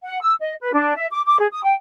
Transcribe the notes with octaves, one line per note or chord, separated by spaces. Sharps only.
F#5
E6
D#5
B4
D4
E5
D6
D6
G#4
D#6
G5